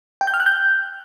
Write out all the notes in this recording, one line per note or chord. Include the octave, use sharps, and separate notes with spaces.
G5
G6
F6
F#6
G6